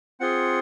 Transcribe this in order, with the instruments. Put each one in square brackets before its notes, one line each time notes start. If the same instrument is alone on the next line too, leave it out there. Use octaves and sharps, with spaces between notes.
[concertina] C4 F4 G#4 F#5